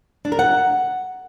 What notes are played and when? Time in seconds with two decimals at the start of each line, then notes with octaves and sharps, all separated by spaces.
0.25 D4
0.32 A#4
0.39 F#5